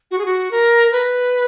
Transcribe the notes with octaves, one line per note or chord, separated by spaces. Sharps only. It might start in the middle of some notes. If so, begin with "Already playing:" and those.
F#4
G#4
F#4
A#4
B4